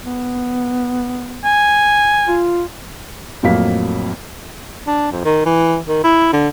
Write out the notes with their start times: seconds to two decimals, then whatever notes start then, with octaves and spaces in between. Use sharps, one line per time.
0.04 B3
1.45 G#5
2.28 F4
3.43 F2 A2 F#3 A#3 F5 B6
4.87 D4
5.12 F2
5.25 D#3
5.46 E3
5.88 D#3
6.04 E4
6.33 D3